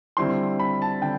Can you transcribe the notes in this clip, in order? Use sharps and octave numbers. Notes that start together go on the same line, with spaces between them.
D3 G3 C4 E4 C6
B5
A5
D3 G5